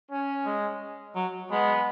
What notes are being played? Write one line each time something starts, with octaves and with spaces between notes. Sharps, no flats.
C#4
G#3
F#3
G#3 B3